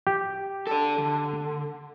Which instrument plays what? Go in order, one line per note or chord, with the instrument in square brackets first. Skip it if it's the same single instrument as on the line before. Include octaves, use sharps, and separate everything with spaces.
[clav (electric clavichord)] G4
[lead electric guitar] A4 D5
D3